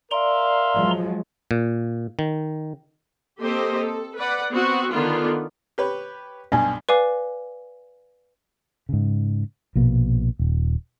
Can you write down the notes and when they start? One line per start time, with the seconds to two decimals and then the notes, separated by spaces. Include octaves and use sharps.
0.11 A#4 D5 E5 F5 A#5 C6
0.74 F3 F#3 G#3
1.51 A#2
2.19 D#3
3.41 A#3 C4 G4 A4 C5 D#5
3.80 A4
4.18 B4 D5 F#5
4.50 B3 C4 F#4
4.93 D3 D#3 B3 F4 D5
5.78 G4 B4 C#5
6.52 B1 G2 G#5
6.89 B4 D5 F5 G#5 D6
8.89 G#2 C#3
9.76 A#1 B2 A#3
10.39 D#1